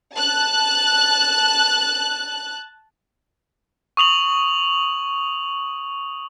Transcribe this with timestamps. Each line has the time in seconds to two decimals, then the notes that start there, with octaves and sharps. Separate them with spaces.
0.15 A5 F#6
3.97 C#6 D#6 F7 F#7